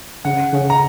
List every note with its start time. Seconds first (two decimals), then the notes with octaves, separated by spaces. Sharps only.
0.25 C#3 F#5
0.53 C#3
0.70 A#5